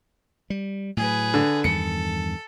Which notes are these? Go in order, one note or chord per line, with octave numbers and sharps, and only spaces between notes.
G3
A2 F#3 G#4 B4
D3
E2 G2 D#3 A4 C#7